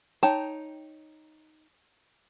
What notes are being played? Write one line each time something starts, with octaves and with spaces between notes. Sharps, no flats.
D#4 C#5 G5 A5